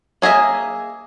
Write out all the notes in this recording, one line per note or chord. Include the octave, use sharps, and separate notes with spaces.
A#3 G#4 D#5 E5